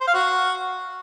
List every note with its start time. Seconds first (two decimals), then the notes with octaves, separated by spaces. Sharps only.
0.01 C5
0.07 F5
0.14 F#4